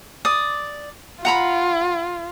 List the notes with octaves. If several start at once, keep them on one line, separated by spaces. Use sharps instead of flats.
D5 D#6
F4 F#5 A#5 B5